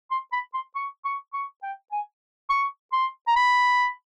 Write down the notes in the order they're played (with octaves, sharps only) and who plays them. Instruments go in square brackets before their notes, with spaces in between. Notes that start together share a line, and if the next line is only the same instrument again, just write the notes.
[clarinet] C6
B5
C6
C#6
C#6
C#6
G5
G#5
C#6
C6
A#5
B5